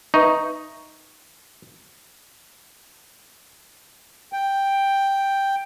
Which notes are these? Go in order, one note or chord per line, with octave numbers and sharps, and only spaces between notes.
D#4 B4 E5 C#6
G5